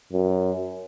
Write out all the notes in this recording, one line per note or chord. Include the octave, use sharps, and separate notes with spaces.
F#2